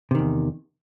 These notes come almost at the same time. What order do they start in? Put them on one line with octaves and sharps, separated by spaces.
C3 D#3 E2